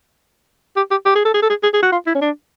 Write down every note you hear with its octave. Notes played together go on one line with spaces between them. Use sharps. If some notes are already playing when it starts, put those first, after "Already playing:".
G4
G4
G4
G#4
A4
G#4
A4
G#4
G#4
G#4
F#4
F4
E4
C#4
D4